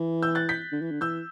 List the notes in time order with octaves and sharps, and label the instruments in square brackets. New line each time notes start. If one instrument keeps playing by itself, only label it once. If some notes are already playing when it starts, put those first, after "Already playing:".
Already playing: [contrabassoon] E3
[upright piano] E6 G6
F#6 A6
G6 B6
[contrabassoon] D3
E3
D3
[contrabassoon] E3 [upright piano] E6 G6